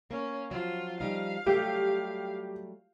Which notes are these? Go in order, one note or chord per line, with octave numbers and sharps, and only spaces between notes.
A#3 C#4
F3 F#3 F4
F3 G3 D#4 F5
F#3 G3 A3 G4